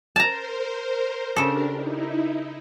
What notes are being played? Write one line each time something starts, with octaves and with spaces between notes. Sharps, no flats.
A#4 C5 A5 A#5
C#3 D4 G4 A4 A#4
D#4 E4